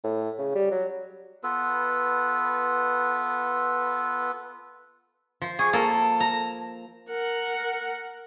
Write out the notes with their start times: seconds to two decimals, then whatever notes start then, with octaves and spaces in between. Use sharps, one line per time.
0.04 A2
0.38 C#3
0.55 G3
0.71 F#3
1.43 B3 F4 A4 B4
5.42 F3
5.59 G#4 C#6
5.73 A#3 A4 A5
6.20 A#5
7.10 A#4 F#5